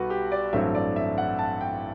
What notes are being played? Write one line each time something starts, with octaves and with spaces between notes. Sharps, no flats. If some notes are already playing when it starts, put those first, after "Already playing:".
Already playing: B1 B2 G3 F#4 A4 B4
G4
D5
A1 G2 F#3 A3 C4 E5
D5
E5
F#5
A5
G5